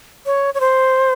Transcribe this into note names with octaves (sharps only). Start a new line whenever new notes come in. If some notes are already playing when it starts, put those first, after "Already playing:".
C#5
C#5
C5